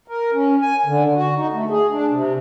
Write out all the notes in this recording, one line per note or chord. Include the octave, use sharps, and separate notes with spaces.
A#4
C#4
G#5
D3
F#4
D#4
A3
G#4
D4
C3